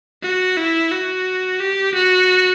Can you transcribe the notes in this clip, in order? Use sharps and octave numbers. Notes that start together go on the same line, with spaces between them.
F#4
E4
F#4
G4
F#4